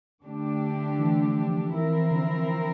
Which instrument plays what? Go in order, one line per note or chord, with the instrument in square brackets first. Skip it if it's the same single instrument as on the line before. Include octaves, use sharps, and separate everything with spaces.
[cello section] D3 A3 D4 G4
[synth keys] E3
F3
F3
[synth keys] E3 [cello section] F3 C4 E4 A#4
[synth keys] D3